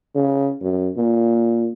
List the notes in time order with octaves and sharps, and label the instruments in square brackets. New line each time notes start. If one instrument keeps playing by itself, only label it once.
[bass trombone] C#3
F#2
A#2